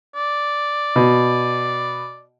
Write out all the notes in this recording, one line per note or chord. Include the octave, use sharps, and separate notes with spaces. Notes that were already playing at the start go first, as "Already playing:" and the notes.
D5
B2